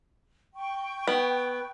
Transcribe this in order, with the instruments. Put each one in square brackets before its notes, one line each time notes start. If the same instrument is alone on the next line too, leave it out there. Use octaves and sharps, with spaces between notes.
[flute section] G5 C#6
[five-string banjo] B3